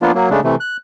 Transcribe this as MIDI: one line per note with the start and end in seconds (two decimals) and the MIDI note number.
0.02 0.12 53
0.02 0.12 58
0.02 0.12 59
0.02 0.12 62
0.02 0.12 65
0.15 0.29 54
0.15 0.29 58
0.30 0.40 49
0.30 0.40 56
0.30 0.40 57
0.30 0.40 62
0.44 0.55 48
0.44 0.55 52
0.44 0.55 57
0.60 0.77 90